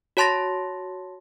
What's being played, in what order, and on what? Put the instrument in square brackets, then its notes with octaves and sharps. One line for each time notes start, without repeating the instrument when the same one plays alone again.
[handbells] F#4 C#5 A5 C6 A6 A#6